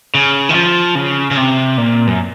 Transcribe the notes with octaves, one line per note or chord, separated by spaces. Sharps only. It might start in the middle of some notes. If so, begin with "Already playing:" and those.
C#3
D#3
F3
C#3
C#3
C3
A#2
F#2